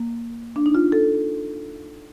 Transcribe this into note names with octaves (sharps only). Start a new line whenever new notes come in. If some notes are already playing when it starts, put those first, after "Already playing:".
Already playing: A#3
D4
D#4
F4
A4